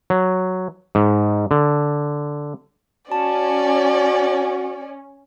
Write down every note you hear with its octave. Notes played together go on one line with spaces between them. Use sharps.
F#3
G#2
D3
C#4 F#4 D5 A5